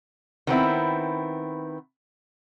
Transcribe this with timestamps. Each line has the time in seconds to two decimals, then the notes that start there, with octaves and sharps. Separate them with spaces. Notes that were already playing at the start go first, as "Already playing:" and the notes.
0.47 D#3 B3 C4 E4